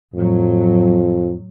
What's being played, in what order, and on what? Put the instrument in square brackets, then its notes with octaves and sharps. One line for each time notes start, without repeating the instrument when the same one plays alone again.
[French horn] F2 [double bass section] A2 F#3